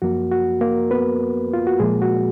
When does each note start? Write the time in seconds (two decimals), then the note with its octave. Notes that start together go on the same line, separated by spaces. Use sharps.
0.02 F#2 F3 A#3 F#4
0.31 F#4
0.61 A#3 A#4
0.91 B3 B4
1.53 F4
1.67 F#4
1.79 A#2 F3 G#3 A#3 G#4
2.02 F#4